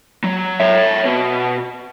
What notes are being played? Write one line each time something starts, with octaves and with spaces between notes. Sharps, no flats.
F#3
C#5 E5
B2